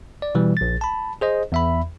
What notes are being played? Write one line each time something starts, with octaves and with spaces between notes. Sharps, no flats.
D5
B2 E3 G3
A#1 A6
A5 B5
G#4 C5 D#5
E2 E5 B5